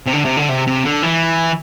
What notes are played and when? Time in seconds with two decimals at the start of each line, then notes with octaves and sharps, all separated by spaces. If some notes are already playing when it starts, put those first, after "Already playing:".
0.06 C3
0.13 D3
0.25 C3
0.37 D3
0.49 C3
0.67 C3
0.85 D3
1.03 E3